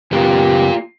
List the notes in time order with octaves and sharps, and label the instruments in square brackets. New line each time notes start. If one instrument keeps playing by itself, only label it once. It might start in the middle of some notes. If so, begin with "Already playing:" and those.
[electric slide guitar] F#2 C#3 B3 [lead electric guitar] A#3 F4 [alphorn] G4